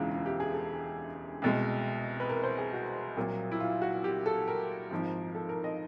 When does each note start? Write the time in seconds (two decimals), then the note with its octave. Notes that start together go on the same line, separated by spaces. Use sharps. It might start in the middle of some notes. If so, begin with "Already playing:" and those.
Already playing: E1 D2 C#3 E3 G#3 F4
0.11 F4
0.26 G4
0.40 G#4
0.54 A4
1.42 C2 B2 G#3
2.20 B4
2.30 A#4
2.44 C5
2.58 G#4
2.73 F#4
3.16 C2 A#2 F#3 A#3
3.51 E4
3.60 F4
3.82 F#4
4.04 G4
4.26 A4
4.48 A#4
4.91 G#1 G#2 F3
5.35 A4
5.49 A#4
5.64 D#5